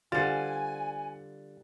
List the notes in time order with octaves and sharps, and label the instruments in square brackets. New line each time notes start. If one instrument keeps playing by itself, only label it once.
[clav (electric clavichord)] D3 F4 [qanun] G3 C5 [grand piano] F#5 A6 [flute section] G#5